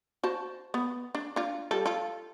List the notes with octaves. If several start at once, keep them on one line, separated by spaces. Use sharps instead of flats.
F#4 C5 A5
B3
D4
D4 F4
G3 F4 A4
F4 A4